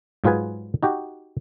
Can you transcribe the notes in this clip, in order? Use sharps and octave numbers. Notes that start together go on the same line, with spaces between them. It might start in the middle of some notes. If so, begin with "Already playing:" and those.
G#2 F#3 F4 G#4 B4 G#5
D#4 F#4 G4